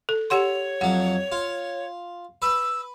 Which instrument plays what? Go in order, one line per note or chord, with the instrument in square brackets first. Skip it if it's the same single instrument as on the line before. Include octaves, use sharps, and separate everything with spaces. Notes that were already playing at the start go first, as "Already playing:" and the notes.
[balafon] A4
[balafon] G4 F#5 C6 [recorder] C#5
[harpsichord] F2 F#3 [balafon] F#5
[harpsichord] F4
[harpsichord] B4 [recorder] E6